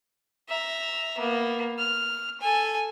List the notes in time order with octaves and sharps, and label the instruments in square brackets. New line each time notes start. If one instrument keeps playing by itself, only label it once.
[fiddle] E5 A#5
A#3 B3
F6
A4 G#5